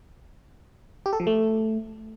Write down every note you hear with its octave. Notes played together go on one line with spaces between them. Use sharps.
G4
A4
F3
A3